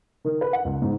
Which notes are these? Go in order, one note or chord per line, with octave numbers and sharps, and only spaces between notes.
D#3
B4
F#5
C#2
G#2